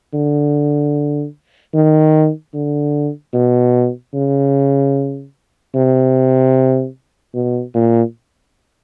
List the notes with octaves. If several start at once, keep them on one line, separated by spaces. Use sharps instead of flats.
D3
D#3
D3
B2
C#3
C3
B2
A#2